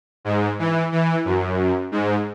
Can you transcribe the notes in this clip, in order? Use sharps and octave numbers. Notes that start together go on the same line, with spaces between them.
G#2
E3
E3
F#2
G#2